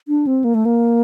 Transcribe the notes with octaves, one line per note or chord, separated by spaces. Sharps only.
D4
C4
A#3
A3
A#3